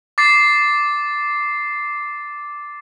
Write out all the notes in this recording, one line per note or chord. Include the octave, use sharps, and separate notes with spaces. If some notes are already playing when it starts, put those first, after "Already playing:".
D6 A6 C7